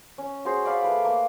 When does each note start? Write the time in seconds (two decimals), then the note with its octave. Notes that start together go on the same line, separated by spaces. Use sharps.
0.18 C#4
0.45 F#4 G#4 C5
0.65 D5 F5 B5
0.82 A3 B4 F5
1.05 A#3